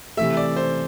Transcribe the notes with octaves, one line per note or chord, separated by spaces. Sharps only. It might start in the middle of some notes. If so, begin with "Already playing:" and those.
C3 E3 A3 E5
D5
C5